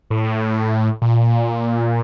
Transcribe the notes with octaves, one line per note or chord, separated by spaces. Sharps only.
A2
A#2